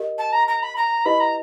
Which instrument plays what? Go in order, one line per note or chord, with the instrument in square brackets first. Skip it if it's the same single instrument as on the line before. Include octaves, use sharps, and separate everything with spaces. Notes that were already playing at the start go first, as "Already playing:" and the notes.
Already playing: [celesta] G4 A#4 D#5
[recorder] A5
A#5
A#5
B5
A#5
[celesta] E4 G4 B4 D#5 [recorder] B5
[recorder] A#5